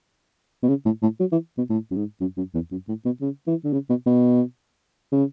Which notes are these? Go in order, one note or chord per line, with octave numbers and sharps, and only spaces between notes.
B2
C#3
A2
A2
F#3
E3
B2
A2
F#2
G#2
F#2
F#2
E2
F#2
A2
B2
C#3
E3
D3
C#3
B2
B2
C#3